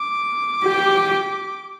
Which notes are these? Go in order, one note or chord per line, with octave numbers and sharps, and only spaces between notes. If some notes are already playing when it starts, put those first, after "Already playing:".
Already playing: D6
G4